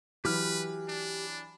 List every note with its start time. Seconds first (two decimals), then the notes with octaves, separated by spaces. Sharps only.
0.25 E3 F#3 G4 B4 F6
0.89 D4